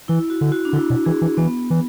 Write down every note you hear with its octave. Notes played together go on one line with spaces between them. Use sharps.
E3 E4
F#4
D3
F#4
D4
D3 E4
B2
E3 G#4
E3
E3 B3
E3